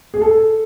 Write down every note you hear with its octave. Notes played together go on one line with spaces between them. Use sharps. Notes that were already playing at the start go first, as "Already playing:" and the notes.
G#4
A4